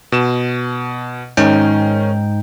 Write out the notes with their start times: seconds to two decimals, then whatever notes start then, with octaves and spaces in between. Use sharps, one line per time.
0.12 B2 E7
1.37 G#2 D#3 C#4 D#4 G5